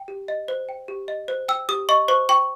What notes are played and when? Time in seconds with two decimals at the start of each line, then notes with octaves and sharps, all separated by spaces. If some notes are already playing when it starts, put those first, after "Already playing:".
Already playing: G5
0.08 G4
0.28 D#5
0.48 C5
0.69 G5
0.88 G4
1.08 D#5
1.28 C5
1.48 G5 E6
1.69 G4 D#6
1.89 D#5 C#6
2.08 C5 C#6
2.29 G5 C#6